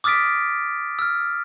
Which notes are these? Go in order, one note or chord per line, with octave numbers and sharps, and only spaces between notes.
D6 D#6 F6 A6 B6 D7
E6 F6